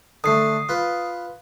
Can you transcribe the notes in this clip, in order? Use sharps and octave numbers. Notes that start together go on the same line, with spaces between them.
D3 A3 D#6 C7
F4 B4